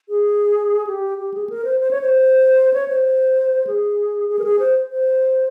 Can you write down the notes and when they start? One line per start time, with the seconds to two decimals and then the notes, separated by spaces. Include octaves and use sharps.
0.09 G#4
0.87 G4
1.18 G4
1.34 G#4
1.50 A#4
1.65 C5
1.80 C5
1.91 C#5
2.01 C5
2.73 C#5
2.88 C5
3.67 G#4
4.29 G#4
4.39 A#4
4.44 G#4
4.59 C5
4.91 C5